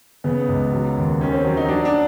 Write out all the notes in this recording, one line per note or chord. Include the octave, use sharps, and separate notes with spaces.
C#3 B3
C#2
F#3
D#2
D#3 C#4
C4
F#3
D#4
F#3 D4
D4